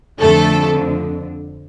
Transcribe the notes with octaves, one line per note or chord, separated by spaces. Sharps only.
F2 D3 A3 A4